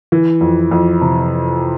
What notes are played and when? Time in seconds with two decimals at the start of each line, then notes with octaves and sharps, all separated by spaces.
0.12 E3
0.41 F2
0.71 F2
1.02 C3